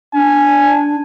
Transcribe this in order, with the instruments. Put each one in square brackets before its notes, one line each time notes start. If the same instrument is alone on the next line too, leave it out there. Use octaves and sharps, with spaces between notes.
[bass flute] D4 [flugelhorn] G#5